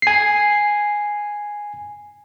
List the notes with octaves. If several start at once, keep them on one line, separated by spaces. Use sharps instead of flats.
G#5 C7